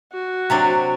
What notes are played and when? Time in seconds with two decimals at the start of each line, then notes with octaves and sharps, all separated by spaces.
0.13 F#4
0.50 C3 F#3 D4